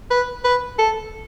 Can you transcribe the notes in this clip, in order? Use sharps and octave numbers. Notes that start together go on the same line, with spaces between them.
B4
B4
A4